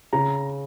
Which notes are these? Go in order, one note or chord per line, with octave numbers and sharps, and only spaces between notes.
C#3 A#5